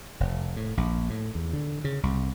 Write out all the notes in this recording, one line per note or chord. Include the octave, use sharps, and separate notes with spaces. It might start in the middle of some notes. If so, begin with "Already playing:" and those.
F1
A2
A#1
A2
E2
D3
C#3
C2